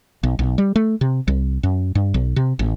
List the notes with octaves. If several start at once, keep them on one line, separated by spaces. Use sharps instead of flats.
B1
B1
G3
A3
C3
C2
F#2
G2
B1
C3
A1